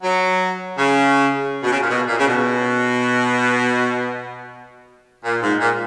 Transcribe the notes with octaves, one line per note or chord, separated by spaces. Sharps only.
F#3
C#3
B2
C#3
A#2
B2
A#2
C#3
B2
A#2
G#2
A#2